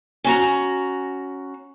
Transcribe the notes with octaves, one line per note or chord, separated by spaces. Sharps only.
C#4 F#4 A#5